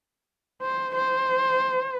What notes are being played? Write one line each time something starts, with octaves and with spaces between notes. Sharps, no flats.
C5
C5